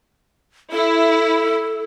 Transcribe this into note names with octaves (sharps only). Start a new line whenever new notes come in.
E4 A4